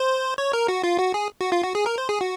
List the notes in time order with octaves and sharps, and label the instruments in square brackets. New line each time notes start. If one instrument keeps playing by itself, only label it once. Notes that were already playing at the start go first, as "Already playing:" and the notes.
Already playing: [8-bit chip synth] C5
C#5
A#4
F#4
F4
F#4
G#4
F#4
F4
F#4
G#4
A#4
C5
G#4
F#4